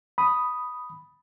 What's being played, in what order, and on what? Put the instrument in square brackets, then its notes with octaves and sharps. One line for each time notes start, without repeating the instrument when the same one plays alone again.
[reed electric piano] B5 D#6